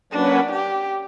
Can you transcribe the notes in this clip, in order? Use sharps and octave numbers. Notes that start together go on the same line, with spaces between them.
F#3 A#3 C#4 D4 F#4 B4
G4